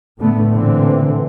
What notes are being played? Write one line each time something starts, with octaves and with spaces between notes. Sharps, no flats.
A2 D3 A3 B3
A#2 D3 E3 C4